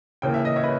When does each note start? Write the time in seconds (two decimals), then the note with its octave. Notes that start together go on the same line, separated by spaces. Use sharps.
0.22 D#2 C#3 E3 A#3 C#4 G5
0.34 E5
0.45 D#5
0.56 C#5 E5
0.64 B4